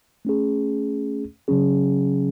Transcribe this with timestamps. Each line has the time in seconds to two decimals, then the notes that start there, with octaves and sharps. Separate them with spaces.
0.25 A3 C#4 G#4
1.48 C#3 F#3 C#4 G#4